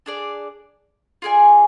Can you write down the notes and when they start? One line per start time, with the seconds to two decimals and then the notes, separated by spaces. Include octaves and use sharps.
0.06 D4 G#4 D5
1.22 F4 G#4 D5 G#5